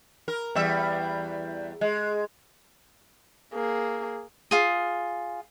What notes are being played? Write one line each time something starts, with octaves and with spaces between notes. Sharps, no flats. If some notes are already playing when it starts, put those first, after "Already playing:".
A#4
E2 G3 E5
G#3
A#3 G#4
F4 G#4